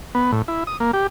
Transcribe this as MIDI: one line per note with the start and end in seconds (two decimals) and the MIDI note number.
0.15 0.32 59
0.32 0.42 45
0.48 0.64 64
0.67 0.77 87
0.80 0.91 58
0.93 1.07 67